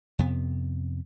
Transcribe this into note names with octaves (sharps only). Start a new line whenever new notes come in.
F2 C3 B3